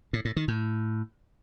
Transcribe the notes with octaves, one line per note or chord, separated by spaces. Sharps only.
A2
A2
D#3
A2